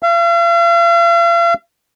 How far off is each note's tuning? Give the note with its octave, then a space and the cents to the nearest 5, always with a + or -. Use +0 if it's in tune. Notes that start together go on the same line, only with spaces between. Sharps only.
F5 -45